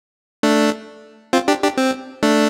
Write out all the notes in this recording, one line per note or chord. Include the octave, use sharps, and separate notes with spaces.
A3 D4
C4 F4
D4 G4
D4 G4
C4
A3 D4